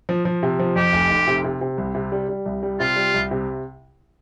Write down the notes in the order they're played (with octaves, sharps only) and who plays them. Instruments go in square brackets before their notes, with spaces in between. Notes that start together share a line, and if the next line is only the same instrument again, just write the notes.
[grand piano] F3
F3
C3
F3
[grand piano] F2 [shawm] G4
[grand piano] F1
F1
C3
C3
C3
C2
C3
G3
G3
C2
G3
[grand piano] C3 [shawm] F4
[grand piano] G3
C2
C3